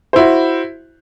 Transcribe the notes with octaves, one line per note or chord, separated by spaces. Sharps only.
E4 F#4 C5